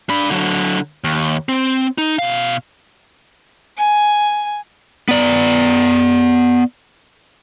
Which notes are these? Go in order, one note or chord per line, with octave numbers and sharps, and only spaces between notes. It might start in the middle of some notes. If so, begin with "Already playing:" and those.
D4 B5
D3 F#3
D#2
C4
D#4
B2 F5
G#5
B3 D5